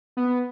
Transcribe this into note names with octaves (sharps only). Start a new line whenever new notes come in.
B3